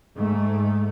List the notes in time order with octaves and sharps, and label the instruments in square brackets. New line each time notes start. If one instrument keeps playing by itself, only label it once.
[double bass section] G#2 A3